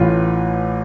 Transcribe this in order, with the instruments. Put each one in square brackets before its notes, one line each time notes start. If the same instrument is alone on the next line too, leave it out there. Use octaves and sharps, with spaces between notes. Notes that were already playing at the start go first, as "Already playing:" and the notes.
Already playing: [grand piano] A1 A2 E3 F4